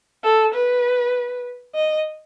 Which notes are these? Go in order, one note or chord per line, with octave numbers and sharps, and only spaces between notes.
A4
B4
D#5